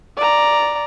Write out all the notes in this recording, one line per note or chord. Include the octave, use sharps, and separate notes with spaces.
D5 A#5